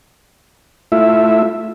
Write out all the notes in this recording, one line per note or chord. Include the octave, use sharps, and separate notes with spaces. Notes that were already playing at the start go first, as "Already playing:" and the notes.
A3 E4 F4 E5